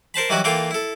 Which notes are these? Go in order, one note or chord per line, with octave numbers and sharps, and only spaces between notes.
A#4 C5 A5 B5
E3 F#3 G3 D#4 E4 F#4
E3 A#3 F4 A4 G5 A#5
E4 A4